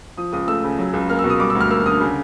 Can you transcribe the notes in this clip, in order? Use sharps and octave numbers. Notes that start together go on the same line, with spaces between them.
F3 D#6
C#2 D#6
A3 E6
C#3
F#3
C#2
A#3 F6
E6
B2
D#6
G3 D6
E6
D2
F6
A#3 E6
D3 D#6
C#3